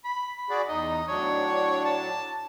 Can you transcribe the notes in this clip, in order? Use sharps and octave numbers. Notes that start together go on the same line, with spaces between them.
B5
B5
F#4 G#4 D5
E2 D#4 D#5
A2 F#3 D4 C#5
A5